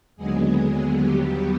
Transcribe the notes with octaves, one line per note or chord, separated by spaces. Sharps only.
D#2 D3 F#3 G#3 B3 G#4
G3 G4